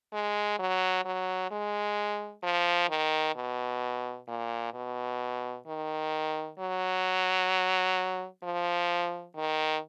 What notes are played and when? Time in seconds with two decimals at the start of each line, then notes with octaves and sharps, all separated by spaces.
0.13 G#3
0.59 F#3
1.05 F#3
1.51 G#3
2.43 F3
2.89 D#3
3.35 B2
4.28 A#2
4.74 B2
5.67 D#3
6.59 F#3
8.43 F3
9.36 D#3